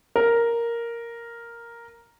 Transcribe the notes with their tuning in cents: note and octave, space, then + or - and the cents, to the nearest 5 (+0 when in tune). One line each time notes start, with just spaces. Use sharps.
A#4 +0